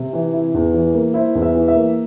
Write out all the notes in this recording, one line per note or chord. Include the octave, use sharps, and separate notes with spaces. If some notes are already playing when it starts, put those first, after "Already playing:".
Already playing: C3
E3
E4
E2
E3
A#3
E4 C5
E2
E5
E3
E5
A#3